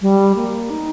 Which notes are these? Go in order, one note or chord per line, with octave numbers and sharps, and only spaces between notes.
G3
A#3
D#4